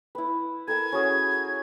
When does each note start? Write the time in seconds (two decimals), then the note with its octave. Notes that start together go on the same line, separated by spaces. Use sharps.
0.15 E4 B4
0.68 A4 A#4 A5 G#6
0.92 C#4 F#4 G#4